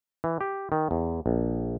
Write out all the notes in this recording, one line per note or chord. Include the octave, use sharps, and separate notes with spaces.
E3
G4
D#3
E2
A#1